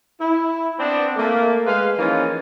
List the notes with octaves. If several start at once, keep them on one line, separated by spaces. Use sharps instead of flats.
E4
B3 C4 D4
A3 A#3
G#3 B4 F5
E3 F3 A#3 C#4 D#4 F4